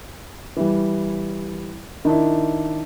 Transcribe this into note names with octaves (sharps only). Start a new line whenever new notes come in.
E3 G3
D#3 D4 E4